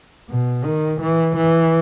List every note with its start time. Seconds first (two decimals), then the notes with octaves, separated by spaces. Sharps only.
0.30 B2
0.64 D#3
1.01 E3
1.36 E3